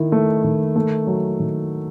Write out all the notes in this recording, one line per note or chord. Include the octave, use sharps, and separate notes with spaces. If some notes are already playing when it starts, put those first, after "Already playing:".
Already playing: D#3 E4
A3
D#3
A3
F#3
D#3